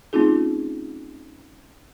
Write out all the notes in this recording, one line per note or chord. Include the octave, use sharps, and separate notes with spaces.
A3 C4 C#4 D#4 F4 G#4